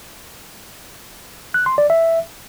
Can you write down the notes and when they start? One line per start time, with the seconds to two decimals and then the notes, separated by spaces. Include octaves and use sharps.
1.54 F#6
1.66 C6
1.78 D5
1.90 E5